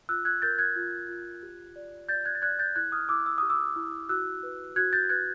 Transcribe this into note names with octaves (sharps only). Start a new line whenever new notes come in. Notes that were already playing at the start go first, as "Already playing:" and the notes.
F4 E6 F#6
F#6 G#6
A#4 G6 A6
F#6 G#6
F4
F4
G4
D5
D5 G6 A6
F#6 G#6
A6
D5 F#6 G#6
G6 A6
E4 F#6 G#6
D#6 F6
E4 D6 E6
E6
G4 D#6
D6 E6
E4
F#4 E6 F#6
B4
F#4 F#6 G#6
G6 A6
B4 F#6 G#6